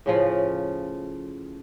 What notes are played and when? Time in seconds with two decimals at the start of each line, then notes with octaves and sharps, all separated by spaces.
0.06 A2 C#3 F3